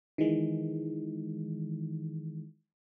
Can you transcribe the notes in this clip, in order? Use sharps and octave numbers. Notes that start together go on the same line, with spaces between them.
D#3 E3 G#3